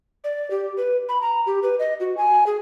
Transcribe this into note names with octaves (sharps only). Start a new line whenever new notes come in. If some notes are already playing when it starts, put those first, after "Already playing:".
D5
G4
B4
B5
A#5
G4
B4
D#5
F#4
G#5
G#4